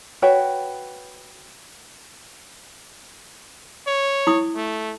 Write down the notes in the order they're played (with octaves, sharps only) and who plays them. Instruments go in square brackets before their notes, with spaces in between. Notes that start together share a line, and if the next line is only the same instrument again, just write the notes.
[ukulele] F#4 B4 C#5 G5
[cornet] C#5
[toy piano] E4 D#6
[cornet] A3